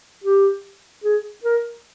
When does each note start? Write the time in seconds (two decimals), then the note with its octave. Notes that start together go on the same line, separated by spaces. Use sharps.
0.24 G4
1.04 G#4
1.44 A#4